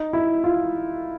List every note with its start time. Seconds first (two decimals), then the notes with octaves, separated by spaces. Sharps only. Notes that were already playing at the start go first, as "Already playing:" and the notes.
Already playing: D#4
0.13 E4
0.44 F4